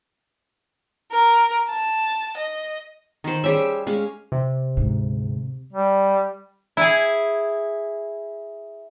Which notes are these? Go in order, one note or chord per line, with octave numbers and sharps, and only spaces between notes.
A#4
A5
D#5
D#3 C5
G3 C#4 G4 G#4 E5
G#3 C#4 F5
C3
D2 G#2
G3
E4 G#4